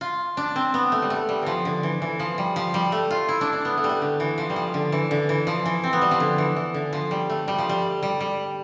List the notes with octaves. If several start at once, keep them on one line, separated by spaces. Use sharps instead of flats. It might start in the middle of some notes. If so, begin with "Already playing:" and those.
F4
D4
C4
B3
A3
G3
A3
G3
E3 F3
D3
E3
E3
F3
G3
F3
G3
A3
F4
E4
D4
D4
B3
A3
G3
A3
D3
E3
F3
G3
F3
D3
E3
D3
E3
F3
E3
C4
B3
G3
F3
D3
E3
E3
D3
F3
G3
A3
G3
F3
G3
G3
G3